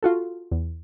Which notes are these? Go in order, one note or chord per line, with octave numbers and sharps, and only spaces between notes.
F4 F#4 A4
E2